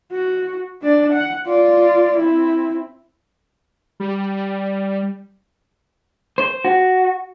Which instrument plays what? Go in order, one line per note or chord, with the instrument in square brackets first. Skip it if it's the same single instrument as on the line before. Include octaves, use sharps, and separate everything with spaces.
[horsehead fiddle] F#4
D4 D5
F#5
F4 D5
C4 E4
[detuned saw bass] G3
[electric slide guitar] C5
F#4